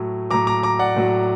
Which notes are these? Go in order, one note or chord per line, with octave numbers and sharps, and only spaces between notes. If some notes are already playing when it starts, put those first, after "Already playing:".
Already playing: A2 F#3
A2 F#3 A#5 D6
A#5 D6
A#5 D6
D5 F#5
A2 F#3